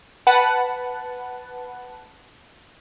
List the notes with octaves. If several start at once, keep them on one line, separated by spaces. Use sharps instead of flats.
B4 F#5 A5